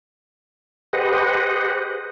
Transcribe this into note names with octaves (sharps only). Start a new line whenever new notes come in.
G4 G#4 B4 C5 D#5 F#5